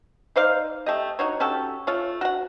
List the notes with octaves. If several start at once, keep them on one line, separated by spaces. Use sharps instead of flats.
D#4 C5 D5 F5
A3 G4 D#5
D#4 F#4 C#5
C#4 F#4 G4 A4
A3 F4 C#5
F#4 F#5